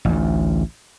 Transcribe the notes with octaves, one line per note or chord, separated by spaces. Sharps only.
A1 D2